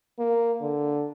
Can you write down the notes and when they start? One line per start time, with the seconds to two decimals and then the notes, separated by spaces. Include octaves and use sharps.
0.19 A#3
0.61 D3